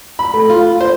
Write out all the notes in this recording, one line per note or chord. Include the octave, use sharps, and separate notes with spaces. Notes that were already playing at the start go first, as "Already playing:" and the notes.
B5
A3
F4
C5